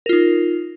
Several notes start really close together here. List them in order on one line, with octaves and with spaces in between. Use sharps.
A#4 F4 D#4